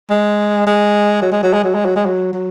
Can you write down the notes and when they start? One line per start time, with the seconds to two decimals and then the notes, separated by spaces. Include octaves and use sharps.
0.10 G#3
0.67 G#3
1.22 F#3
1.32 G#3
1.43 F#3
1.53 G#3
1.64 F#3
1.74 G#3
1.85 F#3
1.96 G#3
2.06 F#3
2.33 F#3